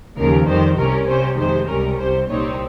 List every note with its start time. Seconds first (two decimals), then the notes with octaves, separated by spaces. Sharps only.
0.16 D#2 C#3 F3 A#4
0.46 F2 D#3 G3 C5
0.77 C2 C3 G3 C#4 A#4
1.07 C3 G3 C#4 C5
1.37 F2 C3 D#3 G#3 C5
1.67 C#2 C3 G3 C#4 A#4
1.98 C2 C3 G3 C5
2.28 C2 A#2 G3 C4 D#4 C#5